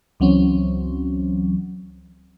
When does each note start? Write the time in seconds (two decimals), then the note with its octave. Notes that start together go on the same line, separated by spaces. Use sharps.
0.20 C#2 E3 F#3 C4 C#4